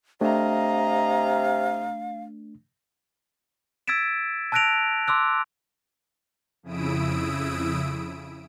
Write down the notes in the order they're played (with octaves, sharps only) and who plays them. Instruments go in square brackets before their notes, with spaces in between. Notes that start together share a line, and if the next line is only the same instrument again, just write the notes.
[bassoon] C3 [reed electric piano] A3 D4 [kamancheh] D#5 A#5 [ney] F5
[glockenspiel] E6 G#6 A6 B6 D7 E7
A5 E6 F#6 A#6 D7 F7
C6 D6 E6 F#6
[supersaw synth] F2 C#3 E4 D#6 E6 D7